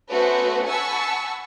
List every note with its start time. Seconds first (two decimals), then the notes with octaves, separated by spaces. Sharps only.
0.10 A3 B3 C#4 F#4 B4 C5
0.66 F#5 G#5 A5 B5 C#6 E6